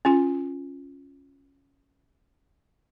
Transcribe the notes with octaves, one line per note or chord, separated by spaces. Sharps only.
C#4 F4 G#5